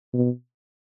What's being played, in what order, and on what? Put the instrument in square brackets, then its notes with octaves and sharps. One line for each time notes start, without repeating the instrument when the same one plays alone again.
[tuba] B2